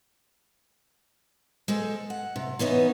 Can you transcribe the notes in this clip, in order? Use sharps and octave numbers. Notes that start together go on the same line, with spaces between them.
G#3 A4 C5
F#5
C3
E3 B3 C#4 D#4